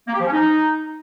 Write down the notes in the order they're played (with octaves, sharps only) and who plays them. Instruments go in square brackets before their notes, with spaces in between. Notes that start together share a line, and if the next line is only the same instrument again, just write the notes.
[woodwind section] A#3
G4
F3
C#4
D#4